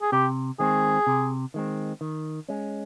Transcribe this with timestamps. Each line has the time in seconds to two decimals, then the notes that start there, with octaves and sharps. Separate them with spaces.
0.02 G#4
0.12 C3 G4
0.59 D#3 G#3 C4 G#4
1.07 C3
1.54 D#3 G#3 C4
2.01 D#3
2.49 G#3 C#4